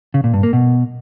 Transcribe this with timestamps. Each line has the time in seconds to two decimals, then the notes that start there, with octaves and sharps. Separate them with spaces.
0.14 C#3
0.24 A#2
0.34 G2
0.43 A#3
0.53 B2